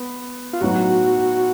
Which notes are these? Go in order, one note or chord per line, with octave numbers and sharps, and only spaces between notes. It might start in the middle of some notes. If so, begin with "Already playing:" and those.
Already playing: B3
F4
A2 F#3 B3 D#4 F#4